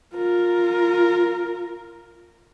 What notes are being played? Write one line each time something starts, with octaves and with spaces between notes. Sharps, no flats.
F4 A#4